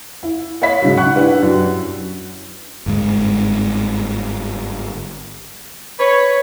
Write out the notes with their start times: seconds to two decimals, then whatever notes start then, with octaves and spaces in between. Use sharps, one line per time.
0.23 E4
0.62 C#5 D#5 E5 B5 B6
0.82 G#2 C#3 F#3
0.97 F#5 C#6 F#6
1.15 D4 E4 G4 B4
1.43 F#2
2.86 G1 G#2 C3 G#3
5.99 B4 C#5